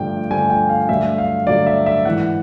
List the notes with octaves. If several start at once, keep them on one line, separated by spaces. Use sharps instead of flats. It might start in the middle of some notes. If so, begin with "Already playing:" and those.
Already playing: G2 D3 F3 A3 G5
G2 D3 F3 A3 G#5
G5
F5
G2 D3 F#3 A3 E5
F5
G2 D3 F#3 A3 D5
E5
E5
G#2 E3 G#3 F#5